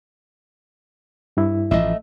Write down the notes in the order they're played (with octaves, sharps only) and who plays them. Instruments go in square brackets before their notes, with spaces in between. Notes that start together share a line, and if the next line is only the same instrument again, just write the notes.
[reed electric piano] G2 E4
[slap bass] A1 F3 [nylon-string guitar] A3 D#5 E5